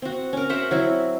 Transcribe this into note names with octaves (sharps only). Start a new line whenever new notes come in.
C4 F#4
C#4 A#4
F#4 C5 E5 F#5
F#3 C4 E4